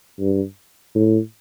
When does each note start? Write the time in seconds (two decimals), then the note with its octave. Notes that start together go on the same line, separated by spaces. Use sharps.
0.20 G2
0.95 A2